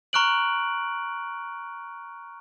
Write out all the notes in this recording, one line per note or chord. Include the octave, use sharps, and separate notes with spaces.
A#5 C#6 F6 F#6 D7 F#7